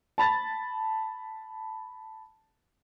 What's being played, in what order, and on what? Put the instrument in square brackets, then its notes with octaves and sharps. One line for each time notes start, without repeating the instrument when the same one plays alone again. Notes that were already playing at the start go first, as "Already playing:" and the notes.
[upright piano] A5 B5 A6